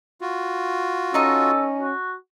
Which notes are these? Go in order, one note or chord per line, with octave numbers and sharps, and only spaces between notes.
F4 F#4
C#4 D#4 A4 D#5 C#6
F#4